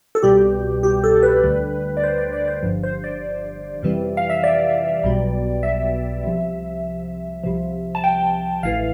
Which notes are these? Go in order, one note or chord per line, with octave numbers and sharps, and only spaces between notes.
A4
C2 B2 G3 G4
G4
A4
B4
D2 D3 G3
D5
C5
D5
D5
C5
G1 G2 F3
C5
D5
F2 C3 E3 G3
F5
E5
D5
B1 B2 G3
E5
C2 C3 F3
C2 C3 F3
A5
G5
A1 A2 E3 F5